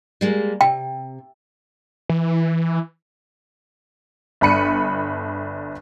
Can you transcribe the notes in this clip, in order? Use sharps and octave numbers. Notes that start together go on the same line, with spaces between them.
G3 G#3 A#3
C3 G5
E3
G1 D4 B5 C#7 D#7